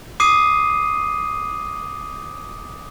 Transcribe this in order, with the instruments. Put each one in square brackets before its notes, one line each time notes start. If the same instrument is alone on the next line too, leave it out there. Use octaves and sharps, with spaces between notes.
[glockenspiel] D6 D#6 C7 D#7